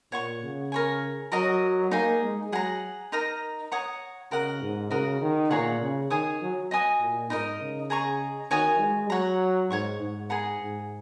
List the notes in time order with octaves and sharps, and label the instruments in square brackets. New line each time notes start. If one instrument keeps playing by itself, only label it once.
[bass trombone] A#2 [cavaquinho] C#5 F#5 C#6
[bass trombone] C#3
[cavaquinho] A#4 C#5 G#5
[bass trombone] F#3 [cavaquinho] F#4 A#4 D#5 A#5
[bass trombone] A#3 [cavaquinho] D#4 G#4
[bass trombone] G#3
[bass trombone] F#3 [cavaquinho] G#4 F#5 A#5
[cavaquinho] D#4 A#4 D#5 A#5
C#5 F#5 A#5 D#6
[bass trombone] C#3 [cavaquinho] F#4 A#4 D#5 F#5
[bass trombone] G#2
[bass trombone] C#3 [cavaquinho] F#4 A#4 D#5 F#5
[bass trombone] D#3
[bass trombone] A#2 [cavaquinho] G#4 C#5 F#5 A#5
[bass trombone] C#3
[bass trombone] D#3 [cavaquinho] G#4 C#5 G#5 D#6
[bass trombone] F#3
[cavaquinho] F#4 D#5 G#5 D#6
[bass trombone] A#2
[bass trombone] G#2 [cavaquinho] D#4 A#4 D#5
[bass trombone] C#3
[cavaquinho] G#4 D#5 A#5 C#6
[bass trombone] D#3 [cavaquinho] F#4 C#5 G#5 D#6
[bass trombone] G#3
[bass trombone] F#3 [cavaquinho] C#5 F#5 A#5
[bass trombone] G#2 [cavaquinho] C#5 F#5 C#6
[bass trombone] G#2
[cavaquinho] G#4 F#5 A#5
[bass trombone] G#2